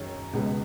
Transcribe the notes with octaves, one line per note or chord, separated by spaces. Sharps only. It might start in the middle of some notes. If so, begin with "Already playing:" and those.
Already playing: F#2 D#3 G#3 C#5
C#2 B2 G#3 B3